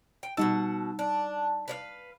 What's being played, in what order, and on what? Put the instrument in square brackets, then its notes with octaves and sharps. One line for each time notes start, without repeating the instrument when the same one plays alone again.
[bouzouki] G5
[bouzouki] B2 F#5 A5 [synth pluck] G3 D#4 E6
[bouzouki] D4
B4 D5 F5